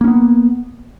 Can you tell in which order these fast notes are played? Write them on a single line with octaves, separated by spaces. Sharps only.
A#3 C#4 B3